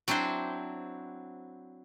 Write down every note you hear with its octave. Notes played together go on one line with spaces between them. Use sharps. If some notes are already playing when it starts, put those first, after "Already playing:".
F#3 C4 D4 E4 C5